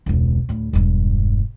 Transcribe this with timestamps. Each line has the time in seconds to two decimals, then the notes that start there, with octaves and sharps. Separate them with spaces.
0.06 E1 C#2
0.49 D2 A2
0.73 E1 G2